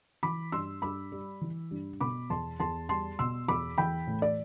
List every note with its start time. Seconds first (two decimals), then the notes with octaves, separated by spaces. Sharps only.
0.23 E3 B5 D6
0.52 G2 C6 E6
0.82 G2 B5 D6
1.12 G3
1.41 E3
1.71 G2
2.01 B2 B5 D6
2.30 E2 A5 C6
2.60 E2 A5 C6
2.89 G3 A5 C6
3.19 B2 C6 E6
3.48 E2 B5 D6
3.78 E3 G5 B5
4.07 A2
4.22 D5